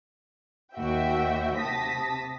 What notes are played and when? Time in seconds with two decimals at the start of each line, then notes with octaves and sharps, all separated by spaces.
0.75 D#2 F#4 E5 G5
1.57 C3 A5 D#6 A#6 B6